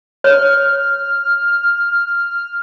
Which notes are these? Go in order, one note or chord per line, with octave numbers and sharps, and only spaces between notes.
C#5 F6